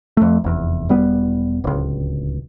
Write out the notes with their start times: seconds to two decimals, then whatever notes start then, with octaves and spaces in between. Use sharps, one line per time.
0.17 F2 A3
0.44 F1 E2
0.89 E1 G3 B3
1.64 D1 C#2